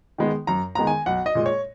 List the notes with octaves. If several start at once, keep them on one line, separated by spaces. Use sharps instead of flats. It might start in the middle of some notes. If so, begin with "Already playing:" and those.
D#3 G#3 B3
F#2 A#5
D#3 G#3 B3 A#5
G#5
B1 F#5
D#5
A#2 G#3
C#5